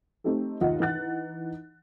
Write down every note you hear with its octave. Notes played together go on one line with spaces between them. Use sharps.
A3 C4 D#4 G4 A4
D#2 D#4 F4 D#5 F#5
E3 D#4 F#5 F#6 A6